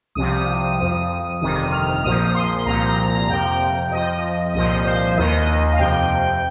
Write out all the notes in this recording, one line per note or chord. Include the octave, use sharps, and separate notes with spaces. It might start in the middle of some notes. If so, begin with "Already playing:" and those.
C2 C3 F3 D#6
F2 F3
G1 F2 C3 D#3 D#6
F6
A#1 A#2 F3 D#6
C6
C2 A#2 F3 A#5
A#5
F2 C3 F3 G5
F2 F3 D#5
C2 A#2 F3 D#5
C5
D#2 D#3 D#5
F5
F2 C3 F3 G5